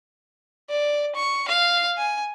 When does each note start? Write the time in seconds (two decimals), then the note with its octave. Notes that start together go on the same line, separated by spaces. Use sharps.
0.70 D5
1.15 C#6
1.48 F5
1.98 G#5